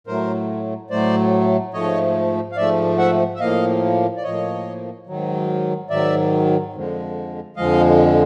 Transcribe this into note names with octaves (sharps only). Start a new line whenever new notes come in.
A2 F#3 A3 A#4 C5
A2 F#3 A3 C5 D5
G#2 F3 A3 C#5 D#5
F5
G#2 F3 A3 D5 E5
E5 F#5
E5
A2 F3 A#3 D#5 F5
D5
A2 F3 A#3 C#5 D#5
G#2 D#3 F#3
G#2 D#3 F#3 D5 E5
F2 D3 F3 G#3
F2 D3 F3 G#3 D#5 F5